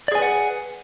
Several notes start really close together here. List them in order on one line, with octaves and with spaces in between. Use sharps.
D5 G#4 G#5 B4 F#5